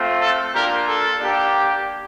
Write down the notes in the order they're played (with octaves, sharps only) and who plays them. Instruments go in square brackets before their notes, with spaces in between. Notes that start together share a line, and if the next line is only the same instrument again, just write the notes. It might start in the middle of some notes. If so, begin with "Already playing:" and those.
Already playing: [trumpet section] A3 C4 F4
A4
A#3 D4 F4 G4 A#4
A4
A#3 D4 G4